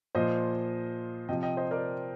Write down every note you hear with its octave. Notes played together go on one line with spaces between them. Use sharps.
A#2 F3 C5 D#5
C3 F3 D#5 G5
D#5 G5
C5 D#5
A#4 D5